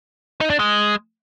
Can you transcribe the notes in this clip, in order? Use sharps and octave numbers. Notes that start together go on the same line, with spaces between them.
D#4
D4
G#3